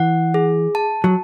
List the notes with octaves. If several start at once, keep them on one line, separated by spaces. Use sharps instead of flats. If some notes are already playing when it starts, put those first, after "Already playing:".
Already playing: E3 F#5
G#4
A5
F#3